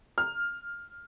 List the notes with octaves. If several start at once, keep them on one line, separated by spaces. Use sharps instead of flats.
F6